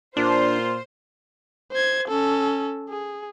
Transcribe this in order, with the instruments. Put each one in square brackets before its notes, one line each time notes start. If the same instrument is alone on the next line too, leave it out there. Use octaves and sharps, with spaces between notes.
[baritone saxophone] A#2 [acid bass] D4 [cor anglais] F4 [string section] C5
[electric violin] C5 G#6
C#4 A4
G#4